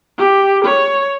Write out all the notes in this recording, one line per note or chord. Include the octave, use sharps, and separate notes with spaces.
G4
C#5